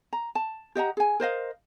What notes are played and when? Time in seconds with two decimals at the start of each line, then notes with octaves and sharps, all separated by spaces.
0.13 A#5
0.35 A5
0.75 G4 D#5 F#5 A#5
0.97 G#4 G#5
1.20 A#4 C5 D#5 F5